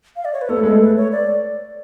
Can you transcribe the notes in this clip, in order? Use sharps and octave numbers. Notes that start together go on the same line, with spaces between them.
F5
D5
C#5
B4
B3 A4
A3
G#3 A4
A3
B4
C#5
D5